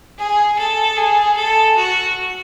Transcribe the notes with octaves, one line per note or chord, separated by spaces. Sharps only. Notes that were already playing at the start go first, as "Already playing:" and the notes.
G#4
A4
G#4
A4
F#4